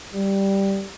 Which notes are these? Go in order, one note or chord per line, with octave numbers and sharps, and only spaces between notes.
G3